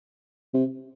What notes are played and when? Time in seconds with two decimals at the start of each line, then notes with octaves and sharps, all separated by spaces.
0.54 C3